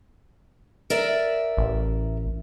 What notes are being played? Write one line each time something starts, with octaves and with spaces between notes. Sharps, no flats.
A#4 D5 E5
A1